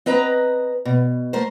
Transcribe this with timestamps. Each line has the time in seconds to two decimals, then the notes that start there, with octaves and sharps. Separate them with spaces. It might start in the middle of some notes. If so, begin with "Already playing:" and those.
0.06 C4 B4 D#5 A#5
0.85 B2
1.33 A3 A#4 C5